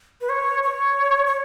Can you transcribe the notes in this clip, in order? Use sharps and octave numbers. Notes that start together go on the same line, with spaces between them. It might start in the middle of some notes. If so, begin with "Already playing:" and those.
B4
C#5
C#5
C#5